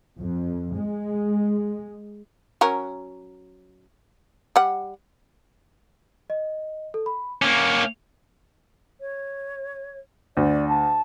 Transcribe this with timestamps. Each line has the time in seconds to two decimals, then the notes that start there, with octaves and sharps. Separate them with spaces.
0.18 F2
0.76 G#3
2.61 F#3 C#4 A#4
4.56 G3 F#5
6.30 D#5
6.94 A4
7.06 B5
7.42 A#3 C#4 D6 C#7
9.01 C#5
10.37 D2 D5
10.68 A5